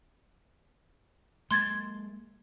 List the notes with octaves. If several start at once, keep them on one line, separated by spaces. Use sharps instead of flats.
G#3 A#3 C6 G#6 A6